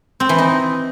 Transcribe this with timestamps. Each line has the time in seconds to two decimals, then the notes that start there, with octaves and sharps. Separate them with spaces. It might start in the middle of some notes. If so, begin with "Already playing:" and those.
0.20 C4
0.29 E3
0.38 D#4